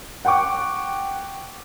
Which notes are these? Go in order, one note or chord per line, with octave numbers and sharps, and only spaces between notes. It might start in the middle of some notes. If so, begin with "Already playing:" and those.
F#5 G5 C#6 D6